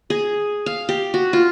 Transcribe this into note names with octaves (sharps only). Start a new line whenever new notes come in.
G#4
F5
G4
F#4
F4